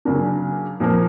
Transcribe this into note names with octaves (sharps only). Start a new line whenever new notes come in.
C#3 F#3 A#3 D4
A#2 F3 A#3